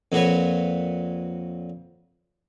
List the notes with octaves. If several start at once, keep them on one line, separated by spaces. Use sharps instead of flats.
F2 A#2 F#4 B4 C#5